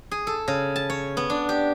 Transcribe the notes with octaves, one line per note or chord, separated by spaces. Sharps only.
G#4
A4
C#3
A5
C#5
B3
D4
G4